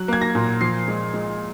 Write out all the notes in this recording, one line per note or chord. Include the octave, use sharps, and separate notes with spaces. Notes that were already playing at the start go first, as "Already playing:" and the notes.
Already playing: F#3 F#6
A#3 G#6
A#6
A#2
F3 C7
G#3
G#3